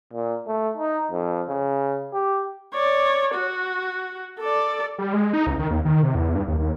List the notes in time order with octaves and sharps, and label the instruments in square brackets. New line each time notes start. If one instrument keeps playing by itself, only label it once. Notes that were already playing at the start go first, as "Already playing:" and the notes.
[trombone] A#2
A3
D#4
F2
C#3
G4
[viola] C#5 D5
F#4
A4 D5
[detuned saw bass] G3
G#3
D#4
C#2
D#3
D#2
D#3
C3
E2
G2
D#2
D#2